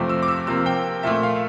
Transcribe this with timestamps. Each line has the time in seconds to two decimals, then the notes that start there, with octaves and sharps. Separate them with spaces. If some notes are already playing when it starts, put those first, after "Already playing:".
Already playing: F2 C3 F3 A3 D6
0.09 E6
0.22 D6
0.28 E6
0.47 C3 F3 A#3 E6
0.66 G5
1.03 A#2 A3 E5
1.23 F5